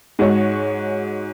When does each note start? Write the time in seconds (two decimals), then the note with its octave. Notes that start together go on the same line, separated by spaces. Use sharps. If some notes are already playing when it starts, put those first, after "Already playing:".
0.19 G#2 G#3 F#4 C#5